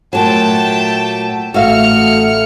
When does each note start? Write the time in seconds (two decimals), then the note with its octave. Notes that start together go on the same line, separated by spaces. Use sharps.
0.13 A#2 F#3 A3 G5 A5
1.54 A1 A3 F#4 E5 F5 F6 C#7